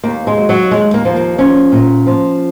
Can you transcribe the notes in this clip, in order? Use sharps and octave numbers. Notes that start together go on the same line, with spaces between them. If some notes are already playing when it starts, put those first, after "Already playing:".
D#2 A#3
G#3
F#3
F#3
D#2 G#3
A#3
F3
A#3
F3 C#4
A#2
F3